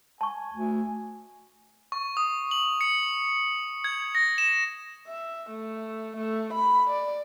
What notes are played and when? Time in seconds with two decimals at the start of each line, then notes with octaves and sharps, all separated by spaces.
0.21 G#5 A5 C#6
0.53 D2
1.92 C#6
2.17 D#6
2.51 F#7
2.81 C#7
3.84 G#6
4.15 A#6
4.38 E7
5.07 E5
5.50 A3
6.16 A3
6.53 B5
6.90 D5